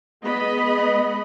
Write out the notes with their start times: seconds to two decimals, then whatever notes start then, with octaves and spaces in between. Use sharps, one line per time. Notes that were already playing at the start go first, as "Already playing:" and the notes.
0.25 G#3 B3 D#5 B5